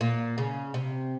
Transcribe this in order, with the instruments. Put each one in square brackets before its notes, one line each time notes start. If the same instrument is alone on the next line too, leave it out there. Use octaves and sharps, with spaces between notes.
[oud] A#2
C#3
C3